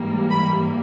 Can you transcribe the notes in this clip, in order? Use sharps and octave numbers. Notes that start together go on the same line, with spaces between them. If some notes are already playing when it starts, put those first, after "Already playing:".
Already playing: G#2 E3 G3 A#3
B5